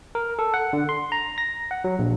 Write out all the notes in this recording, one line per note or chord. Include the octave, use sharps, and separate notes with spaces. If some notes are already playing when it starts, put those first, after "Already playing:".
A#4
A4
F#5
D3
C6
A#5
A#6
F#5
F#3
A#1